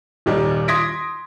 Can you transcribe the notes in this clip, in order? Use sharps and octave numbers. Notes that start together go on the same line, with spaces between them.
D#1 D#2 D#3 G3 D6
C6 D#6 G#6 A#6 B6 D7